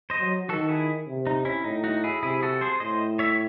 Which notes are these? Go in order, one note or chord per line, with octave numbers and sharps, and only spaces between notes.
C5 D#5
F#3
D#3 F#4 A4
E4 G#4
C3
D#4
C#4 E4
A2 D#4
D#4 F#4
E4 G#4
C3 E4 G#4
F#4 A4
G#4 C5
A2 C5 D#5
C#5 E5